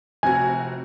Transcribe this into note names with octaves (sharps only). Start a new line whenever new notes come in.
F1 C3 F#4 G#5